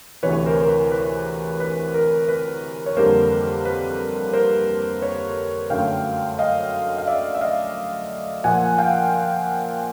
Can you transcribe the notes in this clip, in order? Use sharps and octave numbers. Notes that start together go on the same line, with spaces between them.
D2 C3 E3 B4 C#5
A#4 C5
A#4
B4
B4
B4
A#4
B4
C#5
F2 D3 G3 A#3 A#4 C5
B4
B4
A#4 C5
B4 C#5
F#2 D3 F#3 A3 F5 G5
D#5 F5
F5
D5 E5
E5
D#5 F5
A#2 F3 A#3 F#5 G#5
F5 G5